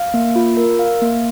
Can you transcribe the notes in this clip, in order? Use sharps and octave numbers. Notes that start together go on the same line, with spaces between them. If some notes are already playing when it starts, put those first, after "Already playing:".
Already playing: F5
A#3
F4
A#4
F5
A#3